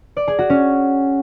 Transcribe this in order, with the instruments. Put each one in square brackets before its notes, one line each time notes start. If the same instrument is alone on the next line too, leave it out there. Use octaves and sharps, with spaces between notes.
[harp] D5
G#4
F#4
C#4